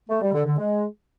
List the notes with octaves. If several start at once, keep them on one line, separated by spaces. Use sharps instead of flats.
A3
G3
D3
D3
G#3